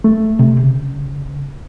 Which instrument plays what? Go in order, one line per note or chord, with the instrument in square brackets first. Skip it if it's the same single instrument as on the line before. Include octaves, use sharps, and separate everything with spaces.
[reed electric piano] A3
C3
C#3